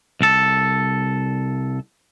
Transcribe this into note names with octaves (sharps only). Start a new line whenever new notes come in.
C2 A4